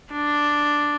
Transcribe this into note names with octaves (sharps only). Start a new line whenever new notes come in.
D4